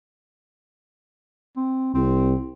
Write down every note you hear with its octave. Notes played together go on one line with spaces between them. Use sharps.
C4
C2 C4